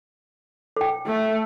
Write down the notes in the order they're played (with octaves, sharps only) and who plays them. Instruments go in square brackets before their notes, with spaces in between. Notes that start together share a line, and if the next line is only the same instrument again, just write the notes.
[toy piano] A4 G5
[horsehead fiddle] A3